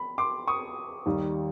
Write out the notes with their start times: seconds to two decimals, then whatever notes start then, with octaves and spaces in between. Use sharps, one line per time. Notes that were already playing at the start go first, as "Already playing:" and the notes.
Already playing: B5
0.18 C6 D6
0.48 C#6 D#6
1.06 D#2 D#3 G3